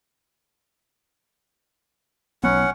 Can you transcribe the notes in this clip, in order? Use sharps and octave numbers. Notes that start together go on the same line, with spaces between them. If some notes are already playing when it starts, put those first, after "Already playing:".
B1 F#3 B3 C#4 F#5